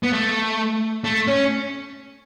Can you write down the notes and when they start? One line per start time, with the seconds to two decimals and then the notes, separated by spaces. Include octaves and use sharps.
0.03 B3
0.13 A3
1.04 A3
1.27 C#4